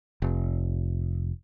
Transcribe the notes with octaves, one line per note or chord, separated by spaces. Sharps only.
F1